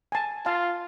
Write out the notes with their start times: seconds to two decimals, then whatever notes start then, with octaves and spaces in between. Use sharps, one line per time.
0.12 G#5 A5
0.46 F4 F5 A5